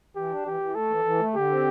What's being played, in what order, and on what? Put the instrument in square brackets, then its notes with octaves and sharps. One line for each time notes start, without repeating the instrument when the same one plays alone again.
[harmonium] E3 [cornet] G4
[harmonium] D4
[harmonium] E3 [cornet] G4
[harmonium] E3
[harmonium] A3 [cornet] A4
[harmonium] E3
E3
A3
[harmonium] D3 [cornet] G4
[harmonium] C4